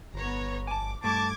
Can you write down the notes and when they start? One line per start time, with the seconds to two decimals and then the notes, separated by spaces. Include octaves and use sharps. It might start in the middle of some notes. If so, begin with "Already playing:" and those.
0.14 G1 B3 C#5 A#5
0.67 G#5 A5 D6
1.04 G2 A3 A5 D6 G#6